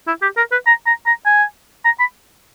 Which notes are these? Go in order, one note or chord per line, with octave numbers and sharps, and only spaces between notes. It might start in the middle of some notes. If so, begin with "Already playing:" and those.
E4
G4
A#4
B4
A#5
A#5
A#5
G#5
A#5
B5